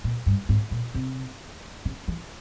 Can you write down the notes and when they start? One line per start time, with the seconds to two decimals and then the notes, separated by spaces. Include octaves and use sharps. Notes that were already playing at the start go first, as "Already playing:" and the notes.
0.04 A#2
0.26 G2
0.49 G#2
0.71 A#2
0.95 C3
1.85 C#3
2.08 E3